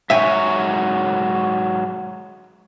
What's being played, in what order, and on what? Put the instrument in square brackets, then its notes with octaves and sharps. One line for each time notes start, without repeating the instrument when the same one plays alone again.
[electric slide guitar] G#2 F#3 C#5 [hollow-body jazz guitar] E5 G5 G#5